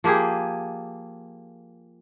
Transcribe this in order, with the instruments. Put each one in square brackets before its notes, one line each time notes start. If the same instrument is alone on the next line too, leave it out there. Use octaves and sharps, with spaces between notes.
[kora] F3 A#3 G4 G#4